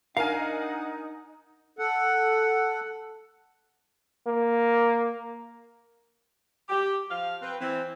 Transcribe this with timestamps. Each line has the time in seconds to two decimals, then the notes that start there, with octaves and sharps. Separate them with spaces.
0.17 D4 D#4 A#4 F5 F#5 G#5
1.79 A4 F#5
4.26 A#3
6.69 G4
7.11 F3 F5
7.42 C4 B4
7.61 E3 C4